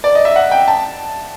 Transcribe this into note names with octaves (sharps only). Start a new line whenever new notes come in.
D5
D#5
E5
F#5
G5
A5